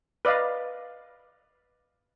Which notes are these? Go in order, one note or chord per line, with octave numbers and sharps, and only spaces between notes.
B4 D5 D#5 F5